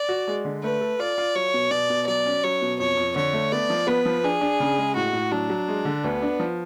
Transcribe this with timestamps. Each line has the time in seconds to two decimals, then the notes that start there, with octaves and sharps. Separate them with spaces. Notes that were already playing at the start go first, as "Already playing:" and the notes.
Already playing: D5
0.09 F#4
0.28 G#3
0.45 D3
0.63 A3 B4
0.81 A4
0.99 F4 D5
1.18 F4
1.35 F#3 C#5
1.54 B2
1.71 B2 D5
1.90 B2
2.07 F#3 D5
2.26 C#4
2.43 F#3 C#5
2.62 B2
2.79 F2 C#5
2.97 F2
3.16 D3 C#5
3.33 A3
3.52 B3 D5
3.70 F3
3.87 B3 B4
4.06 F3
4.24 D4 G#4
4.41 D4
4.60 C#3
4.78 G#3
4.96 A2 F#4
5.13 A2
5.31 F#3 D4
5.50 F#3
5.68 G#3
5.85 D3
6.04 D2 B3
6.22 D4
6.40 F3